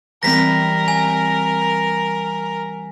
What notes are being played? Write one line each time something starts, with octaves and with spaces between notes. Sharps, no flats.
E3 G3 C4 A#4 A#6 B6
G#5